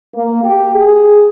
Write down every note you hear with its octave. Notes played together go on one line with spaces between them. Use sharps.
A#3
G4
G#4